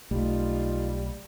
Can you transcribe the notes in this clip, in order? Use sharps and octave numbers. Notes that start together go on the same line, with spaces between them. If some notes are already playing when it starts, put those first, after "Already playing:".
B1 G3 A3 D#4 F4